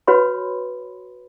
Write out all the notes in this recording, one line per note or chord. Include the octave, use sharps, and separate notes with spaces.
F#4 B4 C#5 B5 C6